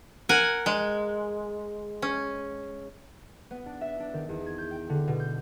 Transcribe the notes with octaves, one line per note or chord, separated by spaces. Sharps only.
A#4 F#5 G#5
G#3
C#4
B3
D4
E5
D4
D#3
E2
G#6
G6
G5
D3
B2
G6